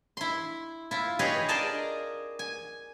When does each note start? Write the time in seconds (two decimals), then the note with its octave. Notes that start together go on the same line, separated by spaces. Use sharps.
0.17 E4 C6
0.91 E4 F4
1.19 G4 G#4 B4 C#5 D#5 F5
1.49 G#4 A#4 D5 D#5 A5
2.39 G#5